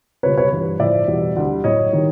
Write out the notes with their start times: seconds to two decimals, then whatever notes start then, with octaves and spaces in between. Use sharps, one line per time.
0.23 C#2 B2 G3 B4 C#5
0.37 B4 C#5
0.51 G2 E3 G3
0.80 A2 F3 D5 E5
1.08 E2 B2 G3
1.36 D2 D3 G3
1.64 A2 F#3 C#5 D#5
1.93 D#3 G3